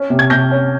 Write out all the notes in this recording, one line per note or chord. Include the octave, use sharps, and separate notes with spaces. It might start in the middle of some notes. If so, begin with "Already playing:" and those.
Already playing: C#4
C3
G#6
C3 G6 A#6
C#4